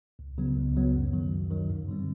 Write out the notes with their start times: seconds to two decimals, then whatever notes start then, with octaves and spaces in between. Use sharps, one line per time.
0.19 C#2
0.38 C#3 F#3 B3
0.56 C#2
0.75 C#3 F#3 B3
0.94 F#2
1.13 D#3 F#3
1.32 F#2
1.51 D#3 F#3
1.70 G2
1.88 D3 G3 C4